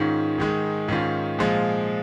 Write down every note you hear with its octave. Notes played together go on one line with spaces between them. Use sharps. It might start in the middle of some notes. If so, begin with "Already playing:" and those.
Already playing: G#2 D#3 C#4 F4
G#2 D#3 G#3
G#2 D#3 C#4 F4
A#2 F3 G#3 F4